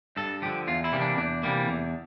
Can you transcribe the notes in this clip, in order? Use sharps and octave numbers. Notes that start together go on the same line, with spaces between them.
G2 A4
D3 F3 G4
E2 F4
E4
C3 E3 G3 A#3
D4
E2 D4
C3 E3 G3 A#3
E2